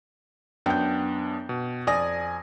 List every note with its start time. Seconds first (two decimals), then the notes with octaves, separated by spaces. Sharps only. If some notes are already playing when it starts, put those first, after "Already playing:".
0.66 F#2 B3 D4 G5 G6
1.49 B2
1.87 F2 D5 G#5 D#6 A#6